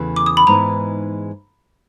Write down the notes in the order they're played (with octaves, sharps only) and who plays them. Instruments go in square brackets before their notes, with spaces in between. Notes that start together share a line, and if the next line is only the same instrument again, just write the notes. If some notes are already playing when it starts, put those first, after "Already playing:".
Already playing: [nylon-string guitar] E2 C#3 E3 A3
[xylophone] D6
D#6
B5
[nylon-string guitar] G#2 E3 G#3 B3 D#4 [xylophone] A#5